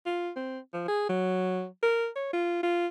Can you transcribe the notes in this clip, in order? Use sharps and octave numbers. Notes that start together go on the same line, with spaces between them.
F4
C4
F3
G#4
F#3
A#4
C#5
F4
F4